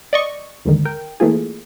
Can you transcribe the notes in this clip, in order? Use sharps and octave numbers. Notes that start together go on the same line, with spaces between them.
D5 D#5 C#6
D#2 G#2 D3 D#3
A#4 G5
E3 A3 A#3 C4 F4 G#4